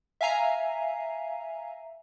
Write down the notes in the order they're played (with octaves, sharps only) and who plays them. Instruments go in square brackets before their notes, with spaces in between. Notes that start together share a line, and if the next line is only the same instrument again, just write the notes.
[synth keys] E5 F5 G#5 A#5 C7